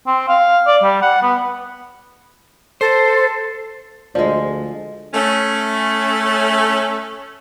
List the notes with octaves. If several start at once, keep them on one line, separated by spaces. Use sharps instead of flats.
C4
F5
D5
G3
F#5
B3
A4 C5
D2 F3 G#3 F4 D5
A3 C#4